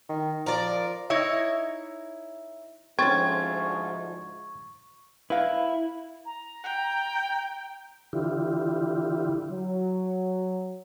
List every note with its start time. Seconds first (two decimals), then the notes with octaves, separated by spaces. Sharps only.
0.09 D#3
0.46 F3 A#4 D5
1.10 D#4 E4 C#5 D#5
2.99 D2 G#2 F3 C4 C#4 C#6 G#6 A6
5.30 E4 B4 F5
6.26 A#5
6.64 G5
8.13 D3 E3 E4 F4 G4
9.50 F#3